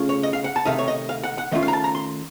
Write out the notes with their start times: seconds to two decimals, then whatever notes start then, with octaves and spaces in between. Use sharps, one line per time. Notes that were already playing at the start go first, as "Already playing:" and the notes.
Already playing: C#3 A3 C#4 F4
0.09 C#5
0.23 D#5
0.33 F5
0.44 F#5
0.56 A5
0.65 C3 D#3 A3 D#4 F5
0.79 C#5
0.88 D#5
1.09 F5
1.23 F#5
1.38 F#5
1.52 D#3 A3 C#4 F4 D#5
1.63 F5
1.68 A#5
1.73 A5
1.84 A#5
1.95 C6